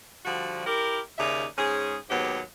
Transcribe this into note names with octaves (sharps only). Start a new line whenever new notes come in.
D3 F3 G3 F#4
E4 G4 A#4
D#2 C#3 D#4 D5 E5
G#2 C#4 G#4
D#2 G#2 F#3 B3 G4